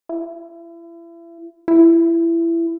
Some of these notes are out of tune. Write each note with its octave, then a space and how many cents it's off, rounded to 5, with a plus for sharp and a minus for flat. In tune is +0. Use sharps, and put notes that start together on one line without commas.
E4 +35
E4 +20